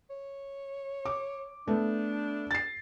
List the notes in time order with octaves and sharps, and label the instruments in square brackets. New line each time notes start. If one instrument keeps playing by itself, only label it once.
[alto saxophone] C#5
[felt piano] D6
[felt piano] A3 B3 [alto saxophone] D4
[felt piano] A6 C7